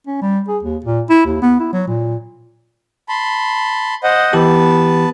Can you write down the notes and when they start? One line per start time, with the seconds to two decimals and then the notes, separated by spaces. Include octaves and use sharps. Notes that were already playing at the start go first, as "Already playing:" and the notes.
0.07 C#4
0.22 G3
0.49 G#4
0.63 D#2
0.85 A#2
1.10 E4
1.26 D#2
1.42 B3
1.60 E4
1.73 F#3
1.88 A#2
3.09 A5 B5 C6
4.03 C5 D#5 F#5
4.33 E3 B3 G4 A5